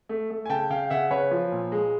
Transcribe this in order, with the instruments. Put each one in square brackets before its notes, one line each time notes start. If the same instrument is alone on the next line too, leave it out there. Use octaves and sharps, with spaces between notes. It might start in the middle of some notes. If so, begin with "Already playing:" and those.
[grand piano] A3
A3
G#5
C#3 G5 A5
C#3 F5 G5
C#3 E5 F#5
C#3 B4 C#5
F3
A#2
G#3